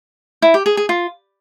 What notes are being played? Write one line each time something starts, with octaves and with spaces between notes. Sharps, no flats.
E4
G4
G#4
G#4
F4